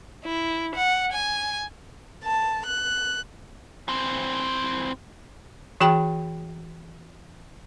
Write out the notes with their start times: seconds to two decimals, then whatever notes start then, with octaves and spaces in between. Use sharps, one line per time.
0.24 E4
0.75 F#5
1.12 G#5
2.23 A5
2.66 F#6
3.88 E3 C4
5.80 E3 F#4 G#4 G5 B5